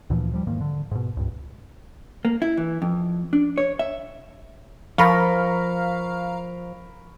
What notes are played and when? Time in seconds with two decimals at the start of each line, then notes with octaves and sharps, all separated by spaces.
0.10 D2 A#2 E3 F3
0.32 D#2 F3 G3
0.47 E2 G#2 D#3 A#3
0.61 D3
0.91 G#2 B2
1.17 C#2 G2
2.25 A#3
2.42 E4
2.57 E3
2.82 F2
3.33 D4
3.58 C#5
3.79 E5
4.98 F3 A#4 F5 A#5 B5 C#6 F6